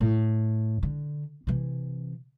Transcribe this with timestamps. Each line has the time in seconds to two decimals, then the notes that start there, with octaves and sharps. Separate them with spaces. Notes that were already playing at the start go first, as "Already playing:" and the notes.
0.01 A2
0.83 D3
1.47 C3 E3